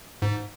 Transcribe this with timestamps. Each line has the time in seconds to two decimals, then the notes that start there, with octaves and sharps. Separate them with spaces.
0.22 G#2